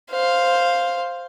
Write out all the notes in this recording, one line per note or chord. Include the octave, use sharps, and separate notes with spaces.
C5 F5